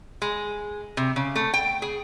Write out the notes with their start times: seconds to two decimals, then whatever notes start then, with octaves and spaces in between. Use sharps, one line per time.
0.22 G#3
0.97 C3
1.16 C#3
1.36 A3
1.54 G5
1.82 G#4